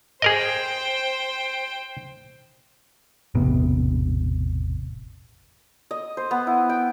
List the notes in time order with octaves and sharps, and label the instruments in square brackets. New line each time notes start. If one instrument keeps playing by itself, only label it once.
[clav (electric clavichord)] G#4 A#4 D#5 [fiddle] C5 G5
[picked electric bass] E1 A1 C3 B3
[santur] D#5
C5
B3
E4
G5